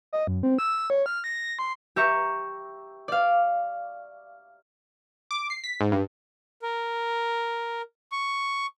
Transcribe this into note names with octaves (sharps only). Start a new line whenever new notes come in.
D#5
F#2
C4
E6
C#5
F6
A#6
C6
G4 E5 A#5 C#6
D5 F5
D6
C7
B6
G#2
G2
A#4
C#6